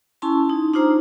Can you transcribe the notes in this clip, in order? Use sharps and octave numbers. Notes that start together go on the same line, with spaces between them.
C#4 E4 G#5 A5 C6
D#4
D4 D#4 F4 C5 A#5